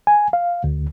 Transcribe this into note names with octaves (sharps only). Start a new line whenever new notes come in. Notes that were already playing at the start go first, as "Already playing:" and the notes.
G#5
F5
D2